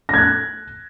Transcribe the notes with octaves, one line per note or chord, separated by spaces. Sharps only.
F#6 G#6 A#6